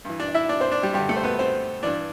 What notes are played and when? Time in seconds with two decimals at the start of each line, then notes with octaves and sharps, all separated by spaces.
0.05 G2 E3
0.20 D4 D5
0.34 E4 E5
0.49 D4 D5
0.60 C4 C5
0.72 D4 D5
0.83 G3 G4
0.94 G2 D3 G3 G4
1.09 A3 A4
1.17 C5
1.23 B3 B4
1.39 C4 C5
1.83 G2 E3 D4 D5